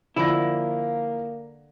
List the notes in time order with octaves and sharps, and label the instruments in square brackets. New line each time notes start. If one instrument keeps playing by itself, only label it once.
[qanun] D3 D6 [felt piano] F3 A#6 [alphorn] A#3 [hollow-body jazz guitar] E4